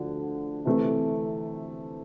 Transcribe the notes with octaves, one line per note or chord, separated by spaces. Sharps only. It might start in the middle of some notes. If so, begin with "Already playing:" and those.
Already playing: D2 D3 F3
C3 E3 A3